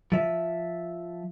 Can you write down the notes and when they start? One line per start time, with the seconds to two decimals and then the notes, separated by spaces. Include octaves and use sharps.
0.12 F3 E5